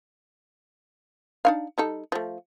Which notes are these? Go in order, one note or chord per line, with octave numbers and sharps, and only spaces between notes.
D4 D#4 F5
G3 D#4 A4
F3 A3